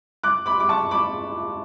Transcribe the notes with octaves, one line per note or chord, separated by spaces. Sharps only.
D6 F#6
B5 D6
D6
A5 C#6
B5 D6